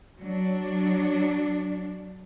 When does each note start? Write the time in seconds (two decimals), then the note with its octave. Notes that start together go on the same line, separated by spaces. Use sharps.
0.18 F#3 D4